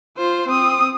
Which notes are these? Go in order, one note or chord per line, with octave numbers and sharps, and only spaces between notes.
F4 C5
C4 D#6